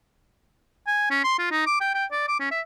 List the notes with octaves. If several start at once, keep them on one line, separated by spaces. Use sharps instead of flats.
G#5
C#4
C6
F4
D#4
D6
G5
G5
D5
D6
C#4
E5